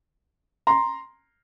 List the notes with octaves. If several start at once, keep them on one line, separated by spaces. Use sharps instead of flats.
A#5 C6